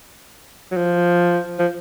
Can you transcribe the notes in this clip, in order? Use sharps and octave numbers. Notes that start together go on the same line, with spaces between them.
F#3
F3
F3